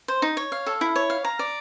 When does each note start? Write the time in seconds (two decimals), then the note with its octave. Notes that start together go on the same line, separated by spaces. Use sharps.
0.08 C5
0.22 D#4
0.37 C#5
0.52 F5
0.66 A4
0.81 E4
0.96 C#5
1.10 F5
1.25 A#5
1.39 D5